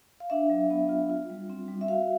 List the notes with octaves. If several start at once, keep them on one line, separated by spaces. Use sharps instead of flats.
F5
D4 E5
F#3
B3
F4
F4
G3
C4
G3
E5
F#4 F5